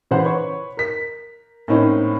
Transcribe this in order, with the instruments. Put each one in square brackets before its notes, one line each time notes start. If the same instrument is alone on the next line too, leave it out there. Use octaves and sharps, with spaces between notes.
[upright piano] C#3 E3 C5 F#5 C6
B4 C#5 C#6
A#4 B6
A2 A#3 C4 C#4 D#4